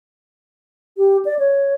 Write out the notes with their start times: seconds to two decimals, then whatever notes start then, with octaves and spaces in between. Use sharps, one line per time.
0.97 G4
1.25 D5
1.39 C#5